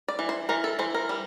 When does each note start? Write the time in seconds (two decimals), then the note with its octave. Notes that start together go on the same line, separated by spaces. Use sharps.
0.08 D5
0.19 E3
0.29 C5
0.49 E3 A#4
0.64 A4
0.79 E3 C5
0.94 A#4
1.09 G3